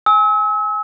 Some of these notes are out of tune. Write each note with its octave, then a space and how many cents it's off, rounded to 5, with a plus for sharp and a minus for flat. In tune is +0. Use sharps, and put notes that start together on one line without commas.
G#5 +0 E6 -40